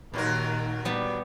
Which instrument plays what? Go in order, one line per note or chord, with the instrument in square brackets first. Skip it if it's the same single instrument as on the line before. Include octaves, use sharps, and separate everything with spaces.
[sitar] D#2 F#3 A#4 [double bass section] A#2 D#3
[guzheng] G3 B3